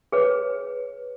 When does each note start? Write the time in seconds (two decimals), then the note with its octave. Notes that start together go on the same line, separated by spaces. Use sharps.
0.12 G#4 B4 C#5